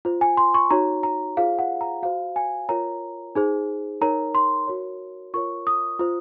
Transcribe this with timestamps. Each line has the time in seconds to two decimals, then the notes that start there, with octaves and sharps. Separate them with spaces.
0.05 F4 C5
0.21 G#5
0.37 C6
0.54 C#6
0.70 D#4 F#4 C#5 A#5
1.03 A#5
1.37 F4 G#4 C5 F5
1.59 F#5
1.81 A#5
2.03 F#4 C5 F5
2.36 G#5
2.69 F4 A#4 C#5 A#5
3.35 D#4 G#4 C5
4.01 D#4 A#4 C#5 A#5
4.35 C6
4.67 F#4 A#4 C#5
5.34 F4 A#4 C#5 C#6
5.67 D#6
5.99 F4 C5